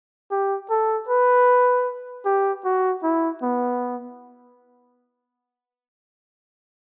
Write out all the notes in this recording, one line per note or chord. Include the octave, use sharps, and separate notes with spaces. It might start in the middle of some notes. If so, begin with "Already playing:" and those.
G4
A4
B4
G4
F#4
E4
B3